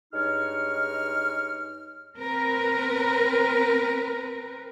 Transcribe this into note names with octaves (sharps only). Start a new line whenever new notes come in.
G2 G#3 D#4 C#5 F6
C4 A#4 B4